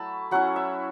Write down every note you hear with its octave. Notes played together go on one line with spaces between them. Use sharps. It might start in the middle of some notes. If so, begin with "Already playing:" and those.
Already playing: F#3 A3 E4 A5 B5
F#3 C#4 E4 F#5
E5